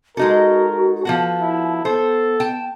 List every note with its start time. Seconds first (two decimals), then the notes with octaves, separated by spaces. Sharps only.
0.17 G#3 D#4 F#4 A4 A#4
1.05 F3 B3 F#4 A5
1.40 E4
1.85 B3 A4 C5
2.40 G5 A5